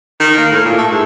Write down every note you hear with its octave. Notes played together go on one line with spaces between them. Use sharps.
D#3
A#3
A2
A#2
A3
G#2